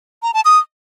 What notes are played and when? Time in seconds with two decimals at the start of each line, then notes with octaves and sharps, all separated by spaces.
0.23 A#5
0.34 A5
0.45 D#6